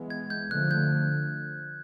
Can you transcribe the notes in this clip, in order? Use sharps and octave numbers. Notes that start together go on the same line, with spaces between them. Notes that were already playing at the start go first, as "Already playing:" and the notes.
Already playing: E3 G#3 B3
G#6
G6
D3 F3 A3 F#6
G6